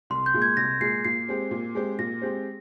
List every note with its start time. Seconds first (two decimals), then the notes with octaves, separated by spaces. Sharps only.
0.10 C2 C6
0.26 G6
0.34 A#2 G#3
0.42 G#6
0.57 C2 A#6
0.80 A#2 G#3 C7
1.05 A#2 C7
1.29 G#3 C4 G4 C5
1.51 A#2
1.75 G#3 C4 G4 C5
1.99 A#2 A#6
2.22 G#3 C4 G4 C5